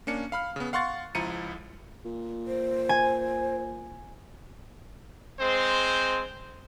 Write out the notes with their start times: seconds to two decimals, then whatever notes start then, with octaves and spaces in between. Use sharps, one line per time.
0.07 A#3 C#4 D4 C#7
0.32 F5 B5 F6
0.56 C#3 B3
0.73 F5 F#5 C6 C#6 A6
1.15 C#2 F3 E4 A#5 C#7 D#7
2.05 A#2
2.47 C5
2.89 G#5
5.40 G#3 C4 C5